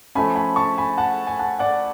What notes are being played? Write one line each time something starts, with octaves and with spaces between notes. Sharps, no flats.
F3 A3 C#4 G#5 B5
G#5 B5
A5 C#6
G#5 B5
F#5 A5
G#5
F#5 A5
D5 F#5